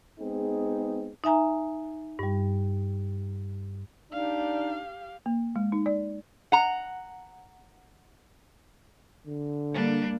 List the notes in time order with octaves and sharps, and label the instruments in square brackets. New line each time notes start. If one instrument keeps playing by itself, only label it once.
[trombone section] G#3 B3 C4 D#4 G#4
[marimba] D#4 E5 G#5 A#5
G2 G3
[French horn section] D4 [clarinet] D#4 [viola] G4 F5
[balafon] A#3
G#3
D#4
D5
[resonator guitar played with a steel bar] F#5 A#5
[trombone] D3
[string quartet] G3 D4 [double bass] A#3